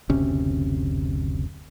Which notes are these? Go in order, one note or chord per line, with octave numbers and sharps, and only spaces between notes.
F#1 D2 C3 C#4